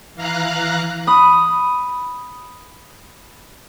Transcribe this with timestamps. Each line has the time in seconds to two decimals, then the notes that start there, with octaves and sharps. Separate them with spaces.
0.15 E3 F5 A#5 F#6
1.07 B5 D#6